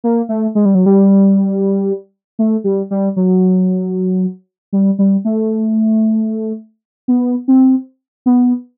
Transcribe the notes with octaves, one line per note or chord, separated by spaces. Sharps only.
A#3
A3
G#3
G3
F#3
G3
A3
G3
G3
F#3
G3
G3
A3
B3
C4
B3